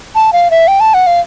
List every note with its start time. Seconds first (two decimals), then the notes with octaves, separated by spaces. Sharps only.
0.15 A5
0.33 F5
0.51 E5
0.68 G5
0.80 A5
0.94 F#5
1.07 F5